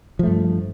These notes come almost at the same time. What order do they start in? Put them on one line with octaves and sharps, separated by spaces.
F3 A3 G2